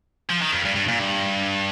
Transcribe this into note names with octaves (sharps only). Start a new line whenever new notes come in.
F3
D#3
F2
G2
G2
A#2
G2